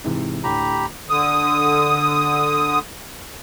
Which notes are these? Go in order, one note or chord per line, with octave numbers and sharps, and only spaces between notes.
G#2 C3 E3
D2 A2 G4 A#5 B5
D3 D#6